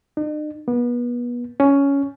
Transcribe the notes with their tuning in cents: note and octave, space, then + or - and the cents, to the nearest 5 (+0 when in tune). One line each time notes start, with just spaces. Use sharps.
D#4 -45
B3 -30
C#4 +10